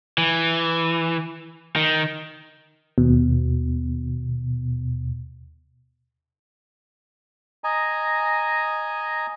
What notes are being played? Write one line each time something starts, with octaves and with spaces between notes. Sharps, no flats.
E3
D#3
D#2 B2
D#5 G#5 A#5